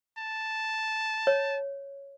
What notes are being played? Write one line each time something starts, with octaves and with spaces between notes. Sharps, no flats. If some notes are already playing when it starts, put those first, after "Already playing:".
A5
C#5